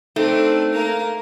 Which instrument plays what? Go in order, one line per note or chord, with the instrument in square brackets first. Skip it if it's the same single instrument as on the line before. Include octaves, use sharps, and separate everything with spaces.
[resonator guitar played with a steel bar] A3 [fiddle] C4 D4 [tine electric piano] D#4
[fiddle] A#3 A#4